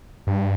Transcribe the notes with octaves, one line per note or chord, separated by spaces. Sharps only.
G2